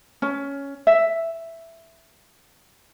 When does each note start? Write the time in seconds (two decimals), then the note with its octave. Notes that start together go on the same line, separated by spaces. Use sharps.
0.22 C#4
0.87 E5